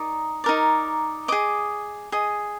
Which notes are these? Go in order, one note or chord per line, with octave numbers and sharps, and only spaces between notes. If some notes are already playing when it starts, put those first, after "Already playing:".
Already playing: D#4 A#4 D5 D#6
D#4 A#4 D5
G#4 D#5 D6
G#4 D#5